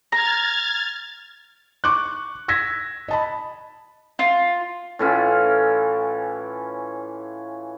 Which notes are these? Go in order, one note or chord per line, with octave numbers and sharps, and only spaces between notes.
A#5 F6 G#6 A6
C#6 D6 F#6
E6 G#6 A#6 B6
D#5 A5 B5
F4
A2 E3 C#4 F4